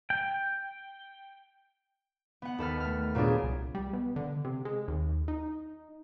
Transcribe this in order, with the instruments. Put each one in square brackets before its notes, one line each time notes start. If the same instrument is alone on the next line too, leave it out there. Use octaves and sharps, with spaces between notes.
[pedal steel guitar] G5
[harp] B3 F#5
D#2 A4 B4 F6
A3 F6
A#2 F#3 B3 D4 G#4
[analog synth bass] C2
G3
B2
D3
C3
G#3
D#2
D#4